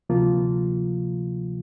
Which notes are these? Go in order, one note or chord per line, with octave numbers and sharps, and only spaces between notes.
D2 C3 F3 A#3 F4